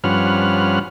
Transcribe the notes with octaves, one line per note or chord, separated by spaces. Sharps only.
G2 F3 C#4 B4 F#5 F6